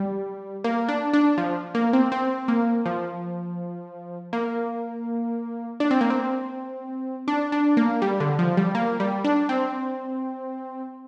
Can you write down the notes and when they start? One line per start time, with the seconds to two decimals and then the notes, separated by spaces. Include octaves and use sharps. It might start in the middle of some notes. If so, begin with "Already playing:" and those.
Already playing: G3
0.64 A#3
0.89 D4
1.14 D4
1.38 F3
1.75 A#3
1.93 C4
2.12 C4
2.48 A#3
2.86 F3
4.33 A#3
5.80 D4
5.91 C4
6.01 A#3
6.10 C4
7.28 D4
7.52 D4
7.77 A#3
8.02 G3
8.20 D3
8.39 F3
8.57 G3
8.75 A#3
9.00 G3
9.24 D4
9.49 C4